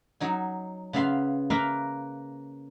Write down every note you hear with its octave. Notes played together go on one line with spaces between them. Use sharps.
F#3 D#4 G#5
C#3 B3 E5 F5 C6
A#3 A#4 B4 E5 F5 A#5